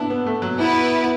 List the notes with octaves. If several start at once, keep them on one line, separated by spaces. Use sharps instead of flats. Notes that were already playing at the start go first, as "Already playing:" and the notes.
Already playing: B3 D4 E4
B3
A3
F#3
B3 E4 B4